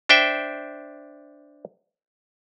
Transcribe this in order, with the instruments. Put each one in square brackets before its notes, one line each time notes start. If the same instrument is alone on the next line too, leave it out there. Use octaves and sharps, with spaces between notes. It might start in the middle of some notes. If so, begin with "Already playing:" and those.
[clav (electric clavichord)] D4 C5 E5 G5